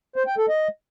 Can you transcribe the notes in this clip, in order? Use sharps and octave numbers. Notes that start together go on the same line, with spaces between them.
C5
G5
A4
D#5